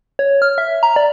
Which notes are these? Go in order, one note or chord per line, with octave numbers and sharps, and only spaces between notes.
C#5
F6
E5
A#5
D5